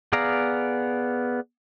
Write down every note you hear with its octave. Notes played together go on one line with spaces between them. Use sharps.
B3 G#4 D5 F5 A#5